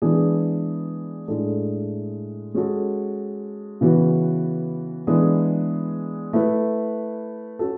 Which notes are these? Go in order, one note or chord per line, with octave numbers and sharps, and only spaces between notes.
E3 G#3 B3 D4 G#4
A2 G#3 D4 A4
G#3 C#4 F#4 A4
C#3 E3 B3 F#4
E3 G#3 B3 D4 G#4
A3 E4 B4
C#4 F#4 A4